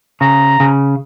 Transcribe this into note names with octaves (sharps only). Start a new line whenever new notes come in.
C#3 A#5
C#3